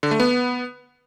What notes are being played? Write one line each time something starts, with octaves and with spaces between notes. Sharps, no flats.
D3
A3
B3